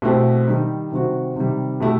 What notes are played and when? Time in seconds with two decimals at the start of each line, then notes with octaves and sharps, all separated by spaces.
0.02 B2 A3 C4 E4 G4
0.47 D#3 G3 D#4
0.91 C3 D#3 G3 C4 F#4
1.36 C3 D#3 G3
1.80 B2 A3 E4 G4